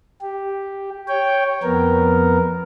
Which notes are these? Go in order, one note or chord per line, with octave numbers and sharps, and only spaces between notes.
G4
C#5 G5
F2 B3 A#4